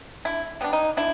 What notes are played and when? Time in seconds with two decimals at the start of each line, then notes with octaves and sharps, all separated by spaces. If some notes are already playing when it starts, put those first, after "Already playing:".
0.25 D3 E4
0.61 G3 B3 D4
0.73 D#4
0.97 D3 E4